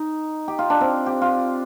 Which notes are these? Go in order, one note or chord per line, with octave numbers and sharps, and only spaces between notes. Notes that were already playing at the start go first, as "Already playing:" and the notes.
Already playing: D#4
G4
F4
D4
C4
G4
F4